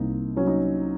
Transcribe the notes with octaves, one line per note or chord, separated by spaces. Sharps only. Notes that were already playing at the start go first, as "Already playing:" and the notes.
Already playing: C2 A#3 C4 D#4
F#3 C#4
D#4